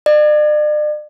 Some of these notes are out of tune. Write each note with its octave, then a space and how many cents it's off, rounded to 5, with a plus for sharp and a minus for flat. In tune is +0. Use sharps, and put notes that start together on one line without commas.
D5 +40